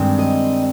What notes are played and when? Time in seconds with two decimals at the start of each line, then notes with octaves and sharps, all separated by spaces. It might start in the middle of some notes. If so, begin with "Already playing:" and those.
Already playing: G2 D#3 G#3 C4
0.19 D#5